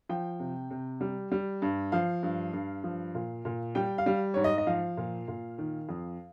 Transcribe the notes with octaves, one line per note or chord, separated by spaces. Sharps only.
F3 G5
C3
C3
G3
G3
G2
F3 F5
G2
G2
F3
A#2
A#2
G3 G5
F5
G3
G#2 C#5
D#5
D#5
F3 F5
A#2
A#2
D#3
F2